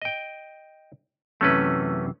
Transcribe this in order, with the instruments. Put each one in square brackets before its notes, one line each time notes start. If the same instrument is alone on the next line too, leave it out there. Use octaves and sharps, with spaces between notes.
[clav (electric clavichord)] D#5 G5
[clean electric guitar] F#2 C3 E3 [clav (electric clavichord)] A3 C#4 B4